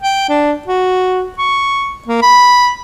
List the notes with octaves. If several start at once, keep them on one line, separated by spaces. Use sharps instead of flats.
G5
D4
F#4
C#6
A#3
B5